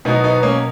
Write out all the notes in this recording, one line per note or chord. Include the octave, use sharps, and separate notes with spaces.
B2 F#3 B3 D#4
B3 D#4
A#3 C#4